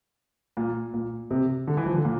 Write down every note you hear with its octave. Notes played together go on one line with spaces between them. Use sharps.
A#2
A#2
C3
D3
E3
F3
D3
A#2